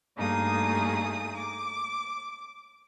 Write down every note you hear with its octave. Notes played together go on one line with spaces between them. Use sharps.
G2 A3 A#3 D#4 G#4 D#6
D6